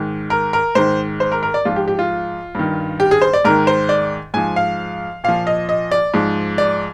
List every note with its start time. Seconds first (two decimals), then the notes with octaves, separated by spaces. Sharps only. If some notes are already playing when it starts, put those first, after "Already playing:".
Already playing: G#2 D#3
0.30 A#4
0.53 A#4
0.75 G#2 D#3 C5
1.20 C5
1.32 A#4
1.43 A#4
1.54 D5
1.65 G#2 F3 F4
1.76 G4
1.88 G4
1.99 F4
2.55 G2 D#3
3.00 G4
3.11 G#4
3.22 C5
3.34 D5
3.45 G#2 D#3 A#4
3.67 C5
3.89 D5
4.34 G#2 F3 G#5
4.56 F5
5.24 A#2 F3 F5
5.47 D#5
5.69 D#5
5.92 D5
6.14 G#2 F3
6.58 D5